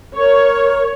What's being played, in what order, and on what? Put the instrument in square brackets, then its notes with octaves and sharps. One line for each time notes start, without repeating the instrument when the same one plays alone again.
[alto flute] A#4 [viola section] C#5